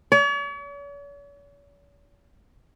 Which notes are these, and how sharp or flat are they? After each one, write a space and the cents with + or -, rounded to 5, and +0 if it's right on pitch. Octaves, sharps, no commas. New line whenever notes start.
C#5 +45